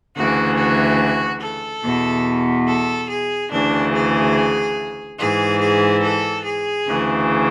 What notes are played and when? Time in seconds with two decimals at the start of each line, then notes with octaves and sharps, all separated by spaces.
0.17 D2 C#3 E3 F#4
0.58 F#4
1.43 A4
1.84 E2 B2
2.68 A4
3.10 G#4
3.51 D2 C#3 E3 D4
3.94 G#4
5.19 G#2 E3 G#4
5.62 G#4
6.03 A4
6.45 G#4
6.88 D2 C#3 E3